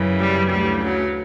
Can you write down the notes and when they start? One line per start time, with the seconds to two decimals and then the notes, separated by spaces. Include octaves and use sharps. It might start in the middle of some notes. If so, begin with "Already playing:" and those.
Already playing: F#2 C#3 E3
0.19 G3
0.50 D2 C#3 E3 G3
0.83 F#3